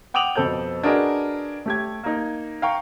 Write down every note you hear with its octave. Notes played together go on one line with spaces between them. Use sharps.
F#5 G5 D6 D#6 F7 F#7
F2 B2 A4 C5 G6
D4 F#4 G#4 A#4 B4 D#5
A3 G4 G#6
A#3 D#4
F5 G5 A#5 C#6